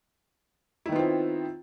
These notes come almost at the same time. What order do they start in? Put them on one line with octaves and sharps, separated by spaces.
E4 D#3 B3 F4 C4